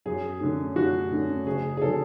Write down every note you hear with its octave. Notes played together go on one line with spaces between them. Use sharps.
F#2 G#4
D3 A3 C#4
F#2 F#4
D3 A3 C#4
F#1 G#4
G#4
D3 F#3 A4